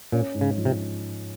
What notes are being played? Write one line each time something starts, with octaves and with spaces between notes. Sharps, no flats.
A#2 C#4
G#2
C#3
F3
C3